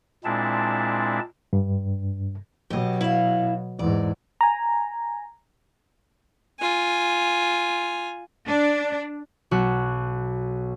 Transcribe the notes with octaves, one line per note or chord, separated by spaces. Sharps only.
A#2 G#3 C4 D4 E4 A5
G2
B2 F#3 G4 D#5
E4 F5
E2 G#2 D5
G#5 A#5
F4 G#5
D4
B1 F#4 F#6